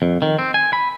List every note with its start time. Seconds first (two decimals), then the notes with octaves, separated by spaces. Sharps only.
0.02 F2
0.22 D#3
0.39 C4
0.54 G#5
0.73 B5